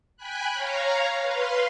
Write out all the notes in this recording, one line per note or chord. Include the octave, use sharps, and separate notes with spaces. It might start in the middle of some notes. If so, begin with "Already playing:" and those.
G5 G#5 B5 F#6
C#5 F5 A#5
B4 F5 C6